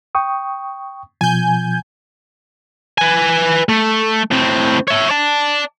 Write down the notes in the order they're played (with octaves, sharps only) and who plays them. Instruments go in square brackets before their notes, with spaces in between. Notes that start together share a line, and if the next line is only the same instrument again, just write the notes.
[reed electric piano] G5 C#6 D#6
[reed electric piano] B2 F3 [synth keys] G#5 G6
[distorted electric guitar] B4 G#5
A3
A2 C4
C#5 E5
D5 A5